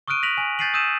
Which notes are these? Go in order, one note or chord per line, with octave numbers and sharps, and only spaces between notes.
C#6 D#6 F6 F#6 D7 D#7
F#6 A#6 B6 D7 F7 F#7
G#5 F#7
G6 A6 B6 C7 D#7 F#7
D#6 E6 G6 D#7 E7